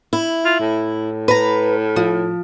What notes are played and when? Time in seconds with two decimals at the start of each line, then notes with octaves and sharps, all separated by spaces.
0.13 E4
0.45 F4
0.60 A2
1.28 B4 A#5
1.96 F3